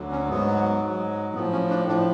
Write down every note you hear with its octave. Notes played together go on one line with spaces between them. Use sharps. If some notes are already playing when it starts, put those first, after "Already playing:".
Already playing: D2 D3 F#3
C#4
G#2 F#3 B3
G#2 F#3
A2 F3 B3
C#4
D4
A2 F3 D4